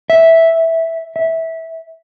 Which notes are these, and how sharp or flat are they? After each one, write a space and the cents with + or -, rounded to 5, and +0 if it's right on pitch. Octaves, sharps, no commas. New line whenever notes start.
E5 -5
E5 -15